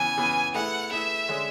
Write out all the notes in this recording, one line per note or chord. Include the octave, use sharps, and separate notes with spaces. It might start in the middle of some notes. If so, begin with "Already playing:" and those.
Already playing: C#3 E3 B3 G#5
C#3 E3 B3
A3 E4 G#4 B4 F#5
A3 E4 G#4 B4 E5
D3 G#3 C#4 G#4